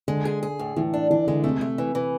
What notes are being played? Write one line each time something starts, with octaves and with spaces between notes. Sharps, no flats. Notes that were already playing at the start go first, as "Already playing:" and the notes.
D3 G#3
G#4
G#4
A2
A2 E3
D4
E3 D4
D3 G#3
C3 A3
A3
E3
E3